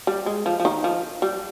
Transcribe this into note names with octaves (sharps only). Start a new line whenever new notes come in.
G3
G#3
F3
F3
D#3
F3
G3